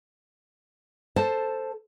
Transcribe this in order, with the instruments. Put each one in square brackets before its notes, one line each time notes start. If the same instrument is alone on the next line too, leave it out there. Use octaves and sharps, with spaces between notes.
[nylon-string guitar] A4 C5 A5